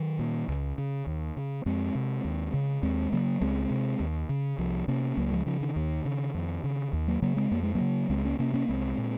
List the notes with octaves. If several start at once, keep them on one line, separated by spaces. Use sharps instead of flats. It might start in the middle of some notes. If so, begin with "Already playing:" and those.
Already playing: D#3 F#3
A#2
C#2
C#3
D#2
C#3
F2 G#3 C4
C3
D#2
C#3
D#2 G#3 C4
C#3 F#3 A#3
C#2 G#3 C4
C3
D#2
C#3
C2 F3
C3 A#3 C#4
C#2 F#3 A#3
F3 G#3
C#3 F3
D#3
D#2
C#3
F2
C#3
D#2
F#3 A#3
C#3 F#3 A#3
G#3 C4
F2 A#3
G#3
F#3 A#3
C#3
C#2 G#3 C4
A#3 C#4
C3 A#3 C#4
A#3 C#4
C2 G#3 C4
A#2